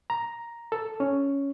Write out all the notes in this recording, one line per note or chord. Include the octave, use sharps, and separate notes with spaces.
A#5
A4
C#4